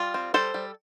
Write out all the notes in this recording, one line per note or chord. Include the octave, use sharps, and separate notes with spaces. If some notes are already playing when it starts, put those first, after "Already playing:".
Already playing: G3 F4
C4
G3 A4 C5
G3